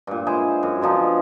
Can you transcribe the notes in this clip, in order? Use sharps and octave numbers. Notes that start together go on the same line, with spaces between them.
G2 A#2
G#3 E4 G#4 C5
F#2
B2 D3 F3 D#4